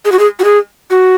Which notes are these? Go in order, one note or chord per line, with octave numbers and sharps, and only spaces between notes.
G#4
F#4
G#4
F#4
G#4
F#4